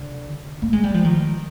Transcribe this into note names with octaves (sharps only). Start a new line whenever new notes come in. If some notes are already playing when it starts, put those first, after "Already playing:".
Already playing: D3
A#3
G#3
G3
F3
D#3